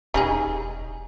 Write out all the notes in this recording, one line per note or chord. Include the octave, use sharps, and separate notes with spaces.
E1 G3 D#4 G#4